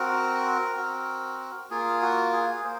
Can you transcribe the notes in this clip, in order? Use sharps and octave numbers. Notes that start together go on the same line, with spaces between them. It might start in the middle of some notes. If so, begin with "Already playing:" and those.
Already playing: C4 F#4 A#4
C4 F#4
A#3 F4 G#4
F#4
G#4
A#3 C5